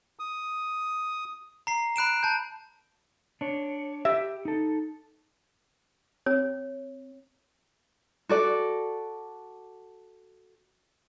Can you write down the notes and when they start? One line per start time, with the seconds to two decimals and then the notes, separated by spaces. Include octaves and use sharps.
0.19 D#6
1.67 A#5 C7
1.96 B5 F#6 D7 E7
2.23 A5 G6
3.41 D4 C#5
4.05 G4 E5
4.45 D#4 A4
6.26 C4 C#5
8.29 F#4 A4 D5